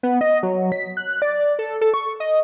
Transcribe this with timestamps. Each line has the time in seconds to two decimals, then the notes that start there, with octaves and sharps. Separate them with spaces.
0.03 B3
0.21 D#5
0.43 F#3
0.72 B6
0.97 F#6
1.22 D5
1.59 A4
1.81 A4
1.94 C#6
2.20 D#5